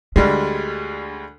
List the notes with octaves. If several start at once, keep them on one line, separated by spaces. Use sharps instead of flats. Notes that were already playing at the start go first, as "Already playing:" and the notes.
D2 G3 G#3 D4